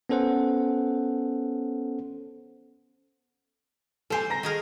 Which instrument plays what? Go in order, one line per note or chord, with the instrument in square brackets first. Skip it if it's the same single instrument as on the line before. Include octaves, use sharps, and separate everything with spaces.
[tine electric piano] B3 C#4 A4 C5 F#5
[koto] G3 C5 [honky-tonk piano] A4 G#5
[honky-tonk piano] A#5 A#6
[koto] D#3 G#4 A#4